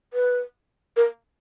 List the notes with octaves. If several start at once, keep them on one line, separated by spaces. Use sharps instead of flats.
B4
A#4